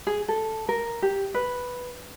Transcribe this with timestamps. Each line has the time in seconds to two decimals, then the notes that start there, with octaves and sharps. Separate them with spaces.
0.07 G#4
0.28 A4
0.69 A#4
1.02 G4
1.34 B4